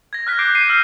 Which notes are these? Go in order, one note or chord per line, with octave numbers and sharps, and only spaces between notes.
G#6 A#6
F6 F#6 B6
D6 F#6 G6 C7 D7
C7 D7 D#7
E6 F6 D#7